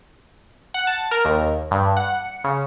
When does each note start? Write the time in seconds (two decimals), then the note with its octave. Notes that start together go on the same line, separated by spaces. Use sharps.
0.74 F#5
0.87 A5
1.11 A#4
1.25 D#2
1.71 G2
1.97 F#5
2.17 C#7
2.44 C#3